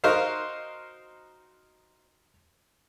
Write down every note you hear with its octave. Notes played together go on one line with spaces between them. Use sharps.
D#4 F#4 A#4 C5 D#5 F5